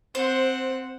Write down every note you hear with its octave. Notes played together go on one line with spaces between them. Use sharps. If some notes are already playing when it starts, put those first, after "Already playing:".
C4 C5 F#5